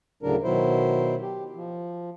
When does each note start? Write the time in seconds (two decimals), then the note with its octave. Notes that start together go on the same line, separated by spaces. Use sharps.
0.23 D2 A2 C#3 F#3 D4 A#4
0.43 B2 D#3 F#3 E4 C5
1.22 G4
1.55 F3